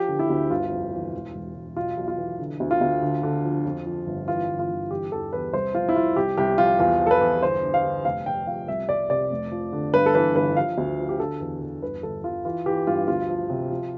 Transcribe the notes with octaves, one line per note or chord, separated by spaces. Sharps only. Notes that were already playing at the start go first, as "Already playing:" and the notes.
Already playing: F3 G4
D3
E4
D2
G1 F4
F2
E3
E1
E1
E1
B1 F4
B1
F4
E3
D3
D2
F4
D2
D3
D3
F3
F2
F3
G1
E3 F4
G1
F4
G1
E3 G4
E2 A4
E2 B4
C2 C5
F3 F4
E4
F3 F4
C2 G4
C2 G4
F3 F4
E2 F4
F3
A4
B4
E2
G1 C5
D3
F5
G1
F1 F5
F1 G5
F2 F5
C2 E5
C2 D5
C3 D5
F1
F3
D3
G2 B4
A4
E3 B4
G1 B4
F3 F5
D2
F3
G4
D3 A4
E2
E2
G1 B4
G1 A4
G1 F4
E3 F4
E3 G4
G2 F4
D2 F4
F3
C3
F3